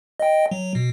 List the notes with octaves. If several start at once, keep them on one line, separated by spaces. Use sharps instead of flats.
D#5 G5
F#3
B2